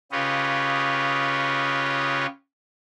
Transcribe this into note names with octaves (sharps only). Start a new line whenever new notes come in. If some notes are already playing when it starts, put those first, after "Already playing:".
C#3 F4 G4 B4 C#5 D#5